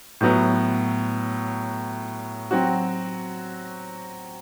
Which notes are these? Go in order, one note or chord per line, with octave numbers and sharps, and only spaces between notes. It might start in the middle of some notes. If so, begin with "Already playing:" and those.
A2 F#3 B3
F#3 C4 F#4